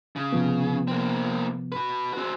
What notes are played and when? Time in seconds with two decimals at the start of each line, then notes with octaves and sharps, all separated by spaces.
0.16 C#3
0.32 C3 F3 B3
0.88 A#3 C4
1.72 F#4 B4
2.13 C4 F#4